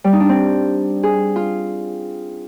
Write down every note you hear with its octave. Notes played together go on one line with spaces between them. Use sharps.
G3
D#4
D4
C4
G#4
F4